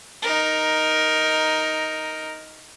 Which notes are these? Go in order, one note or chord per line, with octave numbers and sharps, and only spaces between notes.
D#4 A#4